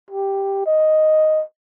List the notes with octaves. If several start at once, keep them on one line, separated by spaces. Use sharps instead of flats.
G4
D#5